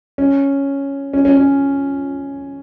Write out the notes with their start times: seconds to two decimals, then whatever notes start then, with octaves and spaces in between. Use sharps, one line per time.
0.18 C#4
1.13 C#4
1.25 C#4
1.37 C#4